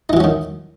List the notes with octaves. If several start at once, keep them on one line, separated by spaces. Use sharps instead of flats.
D#3 E3 F#3 C#4 D#4